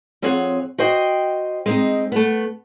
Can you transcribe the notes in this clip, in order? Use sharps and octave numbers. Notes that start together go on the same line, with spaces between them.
F2 C4 G#4 C#5 F#5
F#4 C5 D#5 G5
G#3 C4 D#4
A3 B3